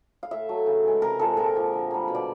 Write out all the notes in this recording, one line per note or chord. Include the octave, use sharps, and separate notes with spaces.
F5
A2 E5
F#3 A3
C#3
E3 G#3
C3 A#4
F3 G#3 C4 A4
A#2 A#4
F3 A#3
D3
G3 A#3
B2
D5